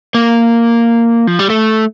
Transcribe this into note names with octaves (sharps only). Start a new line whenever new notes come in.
A#3
F3
G3
A3